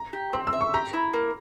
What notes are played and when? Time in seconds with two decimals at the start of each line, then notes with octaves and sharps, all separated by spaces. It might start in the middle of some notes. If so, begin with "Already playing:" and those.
Already playing: A#5
0.13 G4
0.33 C4 C6
0.47 E6
0.53 E5
0.61 C#6
0.74 G4 A#5
0.93 E4
1.13 A#3